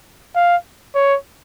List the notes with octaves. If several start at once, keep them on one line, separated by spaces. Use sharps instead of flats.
F5
C#5